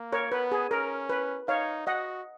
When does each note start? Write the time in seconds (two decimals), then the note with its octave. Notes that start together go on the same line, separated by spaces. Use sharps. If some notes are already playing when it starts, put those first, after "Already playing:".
Already playing: A#3
0.13 A#4 C#5
0.31 B3 B4
0.52 G#4
0.70 C#4 A#4
1.09 B4
1.48 D#4 C#5 F5
1.87 F#4 D#5 F#5